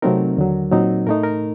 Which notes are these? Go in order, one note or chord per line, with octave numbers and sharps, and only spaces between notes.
C3 F#3 A3 C4 D#4 A#4
D#2 D3 F#3
A#2 F#3 C4 D#4
A2 A3 D#4 A#4
A#4